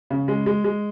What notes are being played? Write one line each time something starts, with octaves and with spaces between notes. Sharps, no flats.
C#3
G#3
G#3
G#3